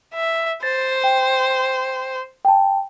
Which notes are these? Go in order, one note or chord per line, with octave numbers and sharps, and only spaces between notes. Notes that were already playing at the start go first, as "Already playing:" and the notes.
E5
C5 A6
G5
G5 A5